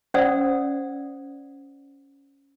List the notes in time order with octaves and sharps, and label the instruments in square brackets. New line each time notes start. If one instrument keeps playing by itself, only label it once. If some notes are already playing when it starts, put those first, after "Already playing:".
[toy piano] C#4 C5 D5 F#5 D#6 E6